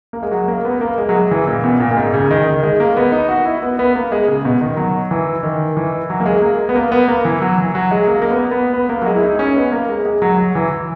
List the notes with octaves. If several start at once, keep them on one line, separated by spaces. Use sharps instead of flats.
A#3
G#3
F#3
A#3
B3
A#3
G#3
F#3
G#3
E3
A#2
B2
A#2
A#2
G#2
C#3
D#3
D#3
G#3
A#3
B3
D#4
F#4
E4
B3
B3
A#3
G#3
C#3
B2
D#3
F#3
E3
D#3
E3
F#3
A#3
G#3
A#3
B3
A#3
B3
A#3
E3
F#3
E3
F#3
G#3
A#3
A#3
B3
B3
B3
A#3
F#3
G#3
E4
D#4
C#4
B3
A#3
G#3
G#3
F#3
F#3
E3